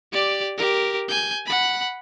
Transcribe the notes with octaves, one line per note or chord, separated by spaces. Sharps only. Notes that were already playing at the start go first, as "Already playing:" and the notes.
G4 D5
G4 A#4
G#5 G6
F#5 B5